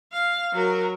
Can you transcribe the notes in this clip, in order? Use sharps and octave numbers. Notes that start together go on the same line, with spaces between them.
F5
F#3 A#4